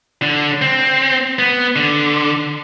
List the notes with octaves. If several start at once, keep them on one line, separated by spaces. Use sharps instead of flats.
D3
C4
B3
D3